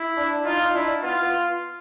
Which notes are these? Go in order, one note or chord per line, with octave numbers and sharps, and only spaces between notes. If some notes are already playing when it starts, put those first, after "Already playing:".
Already playing: E4
D4
D#4 F4
D#4
D4 E4
B3 F4
B3